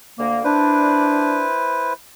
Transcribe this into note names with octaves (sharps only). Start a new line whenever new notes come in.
D2 A#3
D4 E4 B4 C5